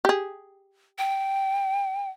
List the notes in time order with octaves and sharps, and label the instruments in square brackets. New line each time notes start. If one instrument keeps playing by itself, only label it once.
[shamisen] G4 G#4
[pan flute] G5